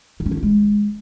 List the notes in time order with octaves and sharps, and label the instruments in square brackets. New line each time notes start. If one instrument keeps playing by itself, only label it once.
[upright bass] D3
C#4
D#3
F4
G#3